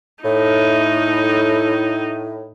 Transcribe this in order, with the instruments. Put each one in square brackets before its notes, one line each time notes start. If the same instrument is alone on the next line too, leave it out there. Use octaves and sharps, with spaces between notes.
[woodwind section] A2 [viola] D#4